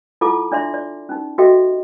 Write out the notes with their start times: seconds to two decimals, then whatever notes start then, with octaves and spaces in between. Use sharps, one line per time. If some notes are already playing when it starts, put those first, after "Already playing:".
0.21 E4 F4 A4 F#5 A5 D6
0.52 D4 D5 E5 C6
0.74 D5
1.09 C#4 D#4
1.38 F#4 G4 A4 D#5 E5 G5